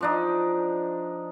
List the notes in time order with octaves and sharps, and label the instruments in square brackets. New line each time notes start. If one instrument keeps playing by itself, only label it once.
[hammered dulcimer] F3 D4 D#4